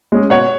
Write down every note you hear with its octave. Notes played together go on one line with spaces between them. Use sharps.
G#3 C#4 G#4
B2 C#5 F#5